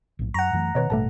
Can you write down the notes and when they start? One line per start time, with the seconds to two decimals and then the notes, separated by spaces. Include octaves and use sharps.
0.19 A#1 A2
0.34 F#2 F#5 A#5 C#6
0.53 F#2 E3 A3
0.75 B2 D#3 B4 C#5 D#5
0.90 A1 G2 B2 A3 A4 A5